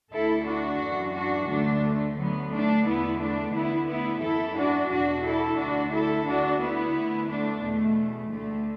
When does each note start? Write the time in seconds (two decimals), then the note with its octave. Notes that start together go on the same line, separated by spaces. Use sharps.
0.13 D2 D3 E4 A4
0.47 D4 F#4
0.81 F#2 E3
1.15 D4 F#4
1.49 D2 D3 A3 D4
1.83 A3
2.17 D2 D3 F#3 B3
2.52 A3 D4
2.85 E2 D3 B3 E4
3.19 A3 D4
3.54 D2 D3 B3 E4
3.88 B3 E4
4.21 F#2 E3 E4 A4
4.56 D4 F#4
4.90 E2 B2 D4 F#4
5.24 E4 A4
5.58 D2 D3 D4 F#4
5.92 E4 A4
6.26 D2 D3 D4 F#4
6.60 B3 E4
6.94 D2
6.99 D3
7.28 A3 D4
7.63 E2 B2 A3
8.31 D2 D3 A3